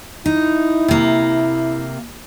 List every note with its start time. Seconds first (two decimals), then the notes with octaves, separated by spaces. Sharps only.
0.26 D#4 E4
0.88 C3 A#3